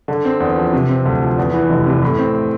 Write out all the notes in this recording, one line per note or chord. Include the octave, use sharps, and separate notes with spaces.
D3
C4
E2
F3
C3
C4
D2
F3
E2
E3
F1
C3
A2
C4